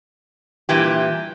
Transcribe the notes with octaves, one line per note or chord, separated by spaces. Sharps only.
G2 A#2 E3 G4